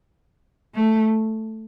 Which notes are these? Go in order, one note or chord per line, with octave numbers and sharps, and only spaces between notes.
A3